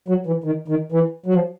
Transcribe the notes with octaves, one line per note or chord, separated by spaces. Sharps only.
F#3
E3
D#3
D#3
E3
F#3
F3